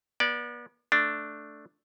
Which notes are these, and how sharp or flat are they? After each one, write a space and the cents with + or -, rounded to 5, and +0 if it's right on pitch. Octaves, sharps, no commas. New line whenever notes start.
B3 -40 D5 +0
A3 +0 D4 +0